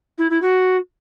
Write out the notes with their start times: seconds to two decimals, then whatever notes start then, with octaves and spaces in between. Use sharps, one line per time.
0.18 E4
0.30 E4
0.42 F#4